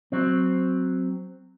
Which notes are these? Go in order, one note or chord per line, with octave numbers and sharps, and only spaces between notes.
F#3 C4